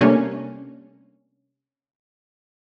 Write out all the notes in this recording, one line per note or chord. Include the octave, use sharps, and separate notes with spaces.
C3 G3 A3 A#3 C#4 D4